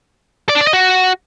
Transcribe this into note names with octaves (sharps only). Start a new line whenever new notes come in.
D5
D4
D5
D#5
F#4